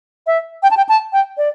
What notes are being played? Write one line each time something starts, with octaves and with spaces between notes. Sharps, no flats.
E5
G5
A5
G5
A5
G5
D5